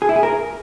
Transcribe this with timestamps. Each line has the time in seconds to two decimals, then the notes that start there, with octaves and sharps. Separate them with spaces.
0.02 G#4
0.09 E4
0.16 G#4
0.23 A#4